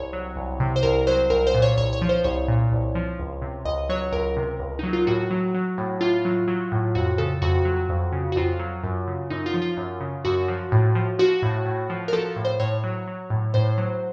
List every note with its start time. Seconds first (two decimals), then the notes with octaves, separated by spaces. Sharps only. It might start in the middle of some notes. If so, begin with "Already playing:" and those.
Already playing: C2 C#5
0.13 F#3
0.36 C2
0.60 C3
0.76 C5
0.83 C2 A#4
1.07 F#3 C5
1.30 C2 A#4
1.47 C5
1.54 A#2
1.62 C#5
1.78 C2 C#5
1.93 C#5
2.02 F3
2.09 C5
2.24 C2 C#5
2.48 A#2
2.72 C2
2.95 F3
3.19 C#2
3.42 C3
3.65 C#2 D#5
3.89 F#3 C#5
4.12 C#2 A#4
4.37 C3
4.59 C#2
4.79 F#3 D#4
4.93 F4
5.07 A2 F#4
5.31 F#3
5.54 F#3
5.78 A2
6.01 A2 F4
6.25 F#3
6.48 F#3
6.72 A2
6.95 F2 F#4
7.18 C#3 A4
7.42 F2 F#4
7.65 F#3
7.89 F2
8.12 C#3
8.32 F#4
8.36 F2 F4
8.60 F#3
8.84 F#2
9.07 C#3
9.30 F#2 D#4
9.46 F4
9.54 F3
9.62 F4
9.77 F#2
10.01 C#3
10.25 F#2 F#4
10.48 F3
10.72 A2
10.95 F3
11.19 F3 F#4
11.42 A2
11.66 A2
11.90 F3
12.08 A#4
12.13 F3 A4
12.36 A2
12.45 C5
12.60 A2 C#5
12.84 F#3
13.07 F#3
13.30 A2
13.54 A2 C5
13.78 F#3